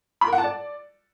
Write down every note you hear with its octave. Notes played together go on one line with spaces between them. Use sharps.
B5
A#4
F#5
A5
D5